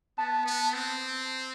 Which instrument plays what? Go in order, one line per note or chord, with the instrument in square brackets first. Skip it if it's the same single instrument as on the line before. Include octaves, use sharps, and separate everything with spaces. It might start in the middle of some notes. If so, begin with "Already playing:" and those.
[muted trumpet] B3 [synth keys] A5
[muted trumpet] B3
C4